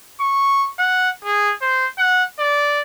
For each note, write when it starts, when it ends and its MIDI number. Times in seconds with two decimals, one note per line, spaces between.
0.21 0.68 85
0.79 1.10 78
1.25 1.53 68
1.62 1.87 72
1.98 2.24 78
2.39 2.82 74